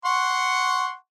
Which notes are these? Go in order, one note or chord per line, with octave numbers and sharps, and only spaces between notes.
F#5 C6 C#6